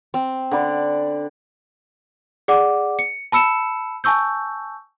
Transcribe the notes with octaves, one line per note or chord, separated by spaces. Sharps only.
C4
D3 D5 B5
G#4 D5 F#5 D6
C#7
A5 B5 E6 C#7 E7
G#5 A5 C#6 E6 G6